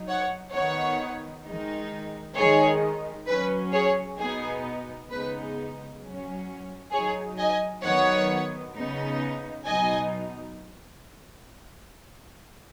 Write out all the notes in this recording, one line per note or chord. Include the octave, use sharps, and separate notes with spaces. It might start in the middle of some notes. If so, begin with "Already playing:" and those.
Already playing: F#3 D#4
C#5 F#5
D#3 B3 D#4 C#5 F#5
D#3 G#3 D#4
D#3 G#3 D#4 G#4 C#5
F#3 C#4 B4
G#4 C#5
B2 B3 D#4 G#4
C#3 G#3 B3 D#4 B4
F#3 C#4
F#3 D#4 G#4 C#5
D#5 G#5
D#3 F#3 B3 D#4 C#5 F#5
C#3 B3 D#4
B2 F#3 D#4 D#5 G#5